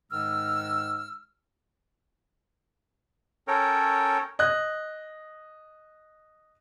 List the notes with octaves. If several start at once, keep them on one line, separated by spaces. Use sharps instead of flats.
G#2 D#3 G#3 E6 F6
C#4 A4 A#4 C#5 G5
D#5 F#6